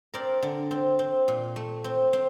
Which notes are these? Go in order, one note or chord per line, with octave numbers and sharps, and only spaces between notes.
C4 A#4 D5
D3
C4
C4
A#2
A3
C4
C4